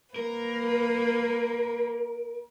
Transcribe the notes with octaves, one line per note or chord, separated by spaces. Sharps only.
A#3 A#4 B4